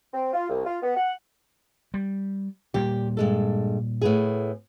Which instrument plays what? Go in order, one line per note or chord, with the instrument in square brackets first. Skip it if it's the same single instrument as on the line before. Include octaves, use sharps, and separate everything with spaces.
[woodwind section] C4
F4
C2
F4
B3
F#5
[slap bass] G3
[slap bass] A#2 G3 A#3 [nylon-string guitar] G4
[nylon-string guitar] G2 G#3 A4
A2 B3 G#4